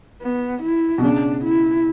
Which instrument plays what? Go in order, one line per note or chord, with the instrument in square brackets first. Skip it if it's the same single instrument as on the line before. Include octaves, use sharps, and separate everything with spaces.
[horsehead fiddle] B3
E4
[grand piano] B2
[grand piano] C#3 [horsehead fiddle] D4
[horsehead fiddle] E4